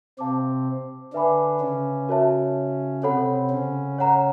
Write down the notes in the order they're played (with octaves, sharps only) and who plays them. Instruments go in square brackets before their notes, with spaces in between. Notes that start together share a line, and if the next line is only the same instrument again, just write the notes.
[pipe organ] C3 C4 [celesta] C5 F5 A5 D6
[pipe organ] D3 D4 [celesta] B4 E5 G#5 B5 D6
[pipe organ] C#3 C#4
[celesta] F#4 A#4 C#5 E5 A5
[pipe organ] C3 C4 [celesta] A4 C#5 F#5 B5
[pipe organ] C#3 C#4
[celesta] C#5 F#5 A#5